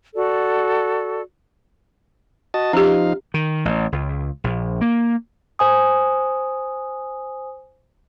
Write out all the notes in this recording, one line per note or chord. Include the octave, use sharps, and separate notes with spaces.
F#4 A4 D5
F#4 D#5 A5
F3 C#4 D#4 G4 F5
D#3
A1
C#2
A#1
A#3
C5 G#5 D#6